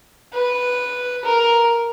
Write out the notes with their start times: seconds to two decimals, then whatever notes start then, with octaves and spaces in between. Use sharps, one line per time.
0.34 B4
1.25 A#4